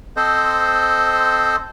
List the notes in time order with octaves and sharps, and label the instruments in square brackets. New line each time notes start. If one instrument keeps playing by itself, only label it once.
[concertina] C4 A4 C5 D#5